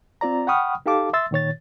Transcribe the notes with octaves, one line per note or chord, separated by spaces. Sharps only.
C4 F4 D5 A#5
F#5 G5 B5 C#6 D#6 F6
D#4 G4 A4 F5 A5 D6
E5 C6 E6 A6
A#2 D#3 C#5 A6